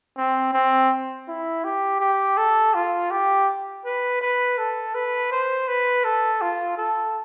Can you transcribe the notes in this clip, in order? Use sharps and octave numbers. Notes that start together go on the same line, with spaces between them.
C4
C4
E4
G4
G4
A4
F4
G4
B4
B4
A4
B4
C5
B4
A4
F4
A4